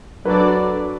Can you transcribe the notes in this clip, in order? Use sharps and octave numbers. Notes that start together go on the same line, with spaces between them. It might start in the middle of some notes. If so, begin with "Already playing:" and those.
F#3 D4 A4 B4 D5